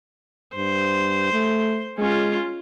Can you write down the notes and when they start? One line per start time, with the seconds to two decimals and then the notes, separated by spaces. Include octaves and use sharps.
0.56 G2 C5
1.32 A3
1.98 G#3 C#4 F4